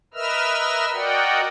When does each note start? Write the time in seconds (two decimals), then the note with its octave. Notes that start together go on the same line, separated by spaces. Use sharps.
0.14 A#4 B4 D#5 E5 E6 F6
0.93 F#4 A#4 D5 D#5 F#5 G5